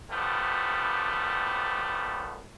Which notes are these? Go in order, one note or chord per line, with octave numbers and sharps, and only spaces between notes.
C2 F#2 F3 G3 A3 B3